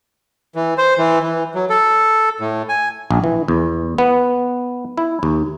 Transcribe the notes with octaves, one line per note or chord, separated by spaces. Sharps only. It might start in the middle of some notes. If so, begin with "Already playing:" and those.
E3
C5
E3
E3
F#3
A4
A2
G#5
A#1
E3
E2
B3
E4
D#2